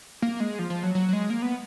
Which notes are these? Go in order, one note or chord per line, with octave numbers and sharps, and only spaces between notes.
A#3
G#3
F3
F3
F#3
F#3
F#3
G#3
A#3
B3